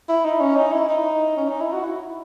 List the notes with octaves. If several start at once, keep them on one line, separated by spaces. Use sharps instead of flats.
E4
D#4
C#4
D#4
E4
D#4
C#4
D#4
E4
F#4
E4